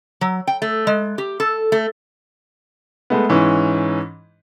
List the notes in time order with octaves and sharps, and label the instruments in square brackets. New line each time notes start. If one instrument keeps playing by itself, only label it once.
[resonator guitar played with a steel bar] F#3
G5
A3
G#3
G4
A4
A3
[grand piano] G#3 A3 B3
G#2 E3 C#4